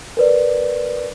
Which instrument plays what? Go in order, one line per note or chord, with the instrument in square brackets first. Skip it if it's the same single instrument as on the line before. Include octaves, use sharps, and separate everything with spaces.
[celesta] A#4 B4 D5